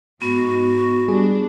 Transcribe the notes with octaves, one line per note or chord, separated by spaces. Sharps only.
G#2 B3 F#4
G3 D4 G#4